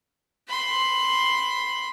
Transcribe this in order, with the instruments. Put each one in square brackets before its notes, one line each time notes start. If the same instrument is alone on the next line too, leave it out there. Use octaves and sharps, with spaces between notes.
[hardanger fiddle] B5 C6